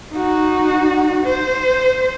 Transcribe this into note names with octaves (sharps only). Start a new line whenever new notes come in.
D#4 F#4
C5